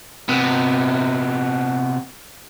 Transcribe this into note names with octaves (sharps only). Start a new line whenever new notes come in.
C3 B3